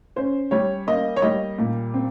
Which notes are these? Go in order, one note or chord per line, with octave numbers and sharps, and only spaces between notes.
C#4 C5
G3 C#5
A#3 D#5
C#5
G3 D#5
A#2
C4